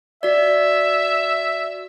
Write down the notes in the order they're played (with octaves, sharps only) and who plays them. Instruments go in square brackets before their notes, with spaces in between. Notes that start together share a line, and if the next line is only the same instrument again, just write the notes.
[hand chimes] F#4 D5 [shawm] E5